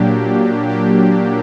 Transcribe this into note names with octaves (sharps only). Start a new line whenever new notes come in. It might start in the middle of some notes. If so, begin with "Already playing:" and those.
Already playing: A#2 F#3 A#3 D4 G4
G4